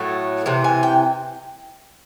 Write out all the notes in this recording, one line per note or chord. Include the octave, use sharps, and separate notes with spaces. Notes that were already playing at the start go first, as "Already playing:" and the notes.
Already playing: A2 F#3 A3
C3 E3
G#5
G5